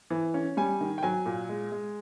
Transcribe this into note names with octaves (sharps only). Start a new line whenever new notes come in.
E3
C#4
G3 G#5
D#3
G5
F#3 G#5
A#2
G#3
G#3